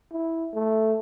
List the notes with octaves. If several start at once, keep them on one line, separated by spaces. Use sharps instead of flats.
E4
A3